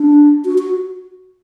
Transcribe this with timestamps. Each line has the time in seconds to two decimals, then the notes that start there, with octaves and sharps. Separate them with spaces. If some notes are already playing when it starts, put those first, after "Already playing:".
Already playing: D4
0.45 F#4
0.58 F#4